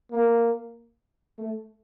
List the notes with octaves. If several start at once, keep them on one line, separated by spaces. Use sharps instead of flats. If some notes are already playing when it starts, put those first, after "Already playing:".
A#3
A3